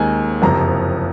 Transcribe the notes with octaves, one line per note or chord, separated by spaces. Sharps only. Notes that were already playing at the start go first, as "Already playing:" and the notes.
Already playing: D#2 D#3 G#3 G#5
F#1 F2 C3 F3 A#5